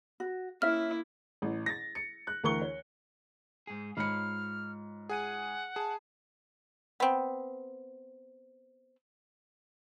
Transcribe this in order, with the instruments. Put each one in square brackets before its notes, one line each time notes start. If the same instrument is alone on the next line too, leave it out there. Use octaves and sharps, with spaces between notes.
[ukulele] F#4
[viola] A#3 E4 [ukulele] C#4 E5 [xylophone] F6
[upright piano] A1
A6 A#6
C#7
F#6
D2 E3 A#4 C#6 C#7 G7
C#5
[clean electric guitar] G#2 G#4
[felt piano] G#2 C#7 [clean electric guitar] F4 C#5 B5 [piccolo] F6
[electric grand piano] G#4 G#5 D#7 [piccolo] F#5
[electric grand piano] G#4 [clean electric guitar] A5
[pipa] B3 C4